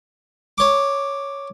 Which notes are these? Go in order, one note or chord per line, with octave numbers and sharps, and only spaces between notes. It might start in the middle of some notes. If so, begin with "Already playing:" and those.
C#5 D6